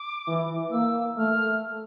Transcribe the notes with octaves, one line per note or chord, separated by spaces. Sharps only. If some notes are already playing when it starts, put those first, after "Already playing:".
Already playing: D6
E3
A#3 E6
A3 F6